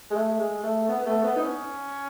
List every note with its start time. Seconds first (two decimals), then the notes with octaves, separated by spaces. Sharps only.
0.10 G#3
0.15 A3
0.39 G#3
0.63 A3
0.88 B3
1.00 B3
1.06 A3
1.24 B3
1.36 D#4
1.42 C#4